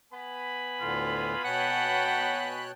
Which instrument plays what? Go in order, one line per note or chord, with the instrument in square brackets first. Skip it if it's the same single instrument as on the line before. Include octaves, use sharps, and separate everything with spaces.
[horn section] B3 G#5 B5
[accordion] D2 A2 D3 [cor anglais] F4
[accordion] B2 C#5 F#6 [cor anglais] F#5 [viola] G5 A5